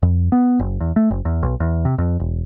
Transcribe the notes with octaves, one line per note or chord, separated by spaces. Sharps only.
F2
B3
F#1
E2
A3
F#1
E2
B1
E2
C3
F2
E1